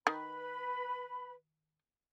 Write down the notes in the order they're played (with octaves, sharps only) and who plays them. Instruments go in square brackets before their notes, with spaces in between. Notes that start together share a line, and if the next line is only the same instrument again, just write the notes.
[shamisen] D#3 [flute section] B4 B5